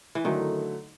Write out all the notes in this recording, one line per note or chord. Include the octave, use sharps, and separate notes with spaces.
E3
D3 D#3 F#3 A3